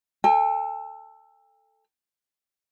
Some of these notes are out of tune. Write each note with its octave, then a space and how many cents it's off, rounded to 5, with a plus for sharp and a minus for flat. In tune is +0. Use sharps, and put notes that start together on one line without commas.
A4 +5 G5 +45